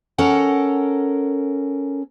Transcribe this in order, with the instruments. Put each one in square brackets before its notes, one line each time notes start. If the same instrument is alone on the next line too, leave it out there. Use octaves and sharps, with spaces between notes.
[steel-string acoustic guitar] C#4 A4 A#4 F#5